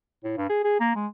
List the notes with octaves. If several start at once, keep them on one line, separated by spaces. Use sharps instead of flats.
A2
G2
G#4
G#4
A#3
G#3